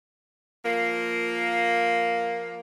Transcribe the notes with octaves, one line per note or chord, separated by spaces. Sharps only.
F3 A#3